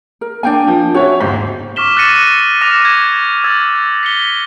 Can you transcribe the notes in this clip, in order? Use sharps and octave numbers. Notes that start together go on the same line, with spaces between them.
A#4
A#3 D4 G5 G#5
F3
C#4 F#4 C#5 E5
G1 D#2 G#2 C5
C#6 D6 F6 B6 E7 G7
E6 F#6 A6 A#6 C#7 D#7
D6 F6 A#6 D#7 F7
G#6
E6 G#6 A6
B6 C#7 G7